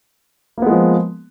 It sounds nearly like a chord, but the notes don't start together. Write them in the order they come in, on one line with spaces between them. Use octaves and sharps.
A#3 B3 G#3 F3